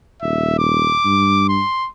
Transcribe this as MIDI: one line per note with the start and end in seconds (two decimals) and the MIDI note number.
0.22 0.95 27
0.22 0.55 76
0.59 1.47 86
1.05 1.61 43
1.49 1.89 84